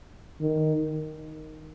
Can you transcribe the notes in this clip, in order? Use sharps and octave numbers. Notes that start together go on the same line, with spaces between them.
D#3